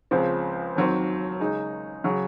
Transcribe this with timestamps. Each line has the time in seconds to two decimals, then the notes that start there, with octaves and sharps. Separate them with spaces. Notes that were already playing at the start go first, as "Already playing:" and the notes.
0.11 C#2 C#3 F3 C4
0.76 D#2 D#3 F#3 C4
1.40 C#3 G#3 D#4
2.04 C#3 F#3